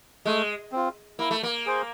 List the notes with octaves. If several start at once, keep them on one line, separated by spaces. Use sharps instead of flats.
G#3 A3
C4 F4
A#3 E4
A3
A#3
G#4 C5